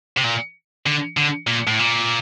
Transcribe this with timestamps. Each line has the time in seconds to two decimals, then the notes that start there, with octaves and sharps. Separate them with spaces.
0.17 C3
0.23 A#2
0.86 D3
1.17 D3
1.47 A#2
1.67 A2
1.79 A#2